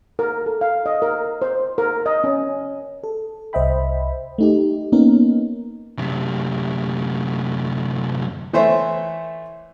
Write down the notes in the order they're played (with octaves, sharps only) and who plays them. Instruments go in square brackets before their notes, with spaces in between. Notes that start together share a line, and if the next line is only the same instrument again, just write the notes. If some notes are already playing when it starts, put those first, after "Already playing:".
[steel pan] A#4
A4
F5
D#5
A#4
C5
A#4
D#5
C#4
[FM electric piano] A4
C2 C5 D#5 E5 G5 B5
A3 D#4 G4
A#3 B3 C#4 D#4 A#4
[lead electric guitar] F#2 C3
[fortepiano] E3 A3 C5 C#5 E5 C6